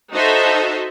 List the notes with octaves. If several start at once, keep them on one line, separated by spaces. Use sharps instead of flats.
D#4 F#4 A4 C5 D#5 E5